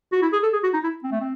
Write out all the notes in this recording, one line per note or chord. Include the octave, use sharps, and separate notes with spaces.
F#4
E4
G#4
A4
G#4
F#4
D#4
E4
C4
A3
C4